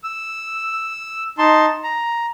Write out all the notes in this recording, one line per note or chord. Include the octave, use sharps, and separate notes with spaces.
E6
D#4 A5 C6
A#5